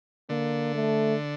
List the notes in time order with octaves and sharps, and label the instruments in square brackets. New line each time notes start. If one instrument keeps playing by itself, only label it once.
[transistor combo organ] D3 [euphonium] A#3
[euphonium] A3